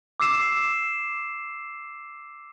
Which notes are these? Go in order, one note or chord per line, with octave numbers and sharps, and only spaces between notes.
D6 E6 C7 E7